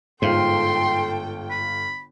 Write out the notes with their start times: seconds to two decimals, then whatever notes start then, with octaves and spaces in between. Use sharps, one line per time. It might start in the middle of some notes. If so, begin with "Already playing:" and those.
0.22 G1 G#2 F4 A4 G5 C6
1.51 B5